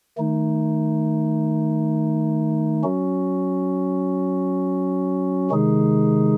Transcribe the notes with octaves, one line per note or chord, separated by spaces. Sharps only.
D#3 A3 D#4
F#3 C#4 F#4
C3 D#3 G#3 D#4 G#4